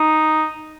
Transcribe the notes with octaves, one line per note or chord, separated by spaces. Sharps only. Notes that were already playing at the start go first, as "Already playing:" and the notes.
Already playing: D#4